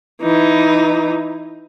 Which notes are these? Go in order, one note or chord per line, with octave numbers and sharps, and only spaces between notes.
E3 D#4